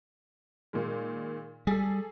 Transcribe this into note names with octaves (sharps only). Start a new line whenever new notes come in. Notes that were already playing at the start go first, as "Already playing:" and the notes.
A#2 D#3 G#3
G3 G#4 A4